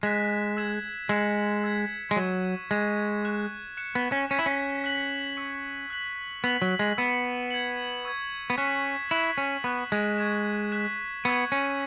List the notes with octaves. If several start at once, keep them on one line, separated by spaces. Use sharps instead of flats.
G#3 F#6 B6 E7
E6 G#6 E7
G#3 E6 C#7 E7
E6 G#6 B6
G#3
F#3 C#6 G#6 E7
G#3 G#6 E7
C#6 F#6 E7
F#6 C#7 E7
B3
C#4
C#4 G#6 B6 E7
E4
C#4
F#6 B6 F#7
C#6 E6 C#7 F#7
F#6 B6 F#7
B3 E6 B6 F#7
F#3
G#3
B3 E6 C#7 E7
G#6 C#7 F#7
C#6 E6 G#6
B3
C#4 F#6 B6 E7
E4 C#6 F#6 B6 F#7
C#4
B3 C#6 F#6 E7
G#3
C#6 G#6 E7
F#6 B6 E7
B3 C#6 E6 G#6
C#4